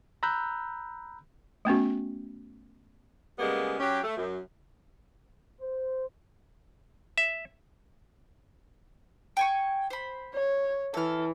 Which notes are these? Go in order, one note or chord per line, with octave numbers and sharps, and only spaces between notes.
A#5 B5 E6 F#6 G6
A3 B3 C#4 F#4
C#3 G3 G#3 A#3 B3
F#3 C#4 G4
A3
F#2
C5
E5
G5 G#5 C#6
C5 B5
C#5
E3 A4 F6